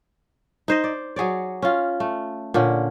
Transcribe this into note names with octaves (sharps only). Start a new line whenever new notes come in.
D#4 C5 D#5
D5
F#3 G#4 C#5 D5
C#4 F4
A3
A#2 D3 C#4